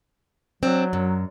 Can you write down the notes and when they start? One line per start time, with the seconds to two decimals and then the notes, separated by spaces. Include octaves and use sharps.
0.63 F#3 C4 D4
0.93 F#2